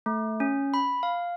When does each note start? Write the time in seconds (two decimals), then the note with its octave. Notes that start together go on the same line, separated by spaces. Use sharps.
0.06 A3
0.40 C#4
0.74 B5
1.03 F5